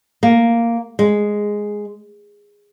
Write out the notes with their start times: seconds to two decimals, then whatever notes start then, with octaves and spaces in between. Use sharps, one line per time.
0.23 A#3
0.99 G#3